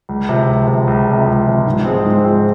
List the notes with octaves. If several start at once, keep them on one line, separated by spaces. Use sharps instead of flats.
C#2
C3 F3
C#2
C3 F3
C#2
C3 F3
C#2
C3 F3
G#2
F3 G#3 C4
G#2
F3 G#3 C4